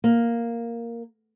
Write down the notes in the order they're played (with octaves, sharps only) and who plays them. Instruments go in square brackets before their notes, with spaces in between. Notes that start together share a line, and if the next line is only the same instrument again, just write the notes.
[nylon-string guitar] A#3